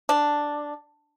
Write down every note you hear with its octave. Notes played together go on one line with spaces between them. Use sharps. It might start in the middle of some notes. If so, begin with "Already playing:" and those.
D4